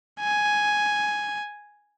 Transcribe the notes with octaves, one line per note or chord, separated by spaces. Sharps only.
G#5